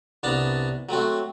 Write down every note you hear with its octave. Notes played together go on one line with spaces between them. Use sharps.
C2 B3 D4 A5 A#5
F#3 A3 C4 F#4